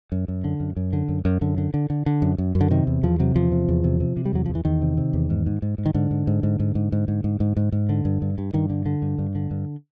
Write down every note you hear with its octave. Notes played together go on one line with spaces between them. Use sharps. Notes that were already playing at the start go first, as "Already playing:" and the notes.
F#2
F#2
D3
F#2
F#2
D3
F#2
F#2
F#2 D3
D3
D3
D3
D3
F#2
F#2
F#2
D3
C3 D#3
E2
E2 F3
C3 F#3
E2 F3
C3
E2
C3
C3
C3
G3
E2 F#3
E2 F3
E3
E2 D#3
C3
C3
E2
G#2
G#2
G#2
G#2
D#3
G#2 D3
G#2
G#2
G#2
G#2
G#2
G#2
G#2
G#2
G#2
G#2
G#2
D3
G2
G2
G2
G2 D#3
D3
D3
G2
G2
D3
G2